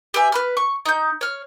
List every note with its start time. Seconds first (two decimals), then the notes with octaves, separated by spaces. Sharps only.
0.14 G4 B4 E5 G#5
0.32 B4 B5 F6
0.57 C#6
0.86 D#4 G6
1.21 C#5 F6